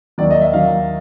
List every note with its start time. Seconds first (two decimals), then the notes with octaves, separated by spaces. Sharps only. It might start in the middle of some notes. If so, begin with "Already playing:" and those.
0.18 D#2 D#3 F#3 D5
0.31 D#5
0.42 E5
0.53 D#2 D#3 F#3 F5